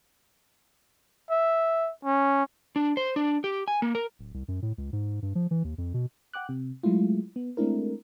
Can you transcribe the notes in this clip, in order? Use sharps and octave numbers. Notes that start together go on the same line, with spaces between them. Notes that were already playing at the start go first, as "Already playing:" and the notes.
E5
C#4
D4
C5
D4
G4
G#5
A#3
A#4
D1
C2
F#2
A2
C#2
G#2
G2
F3
E3
D#2
F2
B2
F#5 G5 D6 F#6
C3
F#3 G#3 A3 E4 F4
B3
G#3 A3 C4 D4 E4 A#4